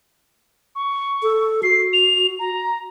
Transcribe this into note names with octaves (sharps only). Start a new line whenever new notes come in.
C#6
A4
F#4 C7
F7
A#5